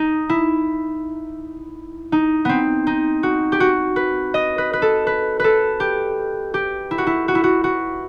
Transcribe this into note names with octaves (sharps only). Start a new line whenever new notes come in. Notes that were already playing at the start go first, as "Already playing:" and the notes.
Already playing: D#4
E4
D#4
B3 C4
D#4
F#4
G4
F#4
B4
D#5
B4
B4
A4
B4
A4 B4
G4
G4
E4
F#4
E4
F#4
E4
F#4
F#4